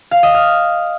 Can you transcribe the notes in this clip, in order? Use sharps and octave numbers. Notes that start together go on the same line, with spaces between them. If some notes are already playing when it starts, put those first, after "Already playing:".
F5
D#5
F6